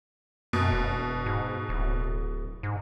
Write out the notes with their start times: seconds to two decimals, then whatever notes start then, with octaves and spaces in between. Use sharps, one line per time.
0.53 F#2 B2
0.72 E1
1.26 G#2
1.69 D1
2.63 G#2